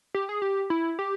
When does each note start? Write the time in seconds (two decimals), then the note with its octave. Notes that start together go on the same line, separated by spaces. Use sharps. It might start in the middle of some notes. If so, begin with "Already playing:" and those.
0.15 G4
0.29 G#4
0.42 G4
0.70 E4
0.99 G4